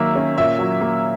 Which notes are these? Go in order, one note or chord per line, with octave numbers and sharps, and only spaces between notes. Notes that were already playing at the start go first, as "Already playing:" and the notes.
Already playing: D#3 F#3 A#3 E5
C#4
A#2 E5
F#3
A#3